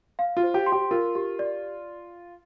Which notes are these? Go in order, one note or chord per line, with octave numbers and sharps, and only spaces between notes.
F5
F4
C5
G4
C6
G4
F4 A#4
G4
D5